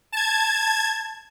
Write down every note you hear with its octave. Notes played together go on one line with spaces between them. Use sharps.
A5 G#6